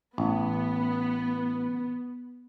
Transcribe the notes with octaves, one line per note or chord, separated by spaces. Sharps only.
A1 B3